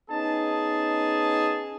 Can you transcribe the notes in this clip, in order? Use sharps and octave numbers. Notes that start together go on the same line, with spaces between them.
B3 C#4 D#4 G#4 A5